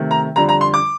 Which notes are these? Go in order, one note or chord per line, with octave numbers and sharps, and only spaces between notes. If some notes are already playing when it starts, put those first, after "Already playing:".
Already playing: C3 D#3 A3
A#5
F2 D3 G3 A#5
A#5
C6
D6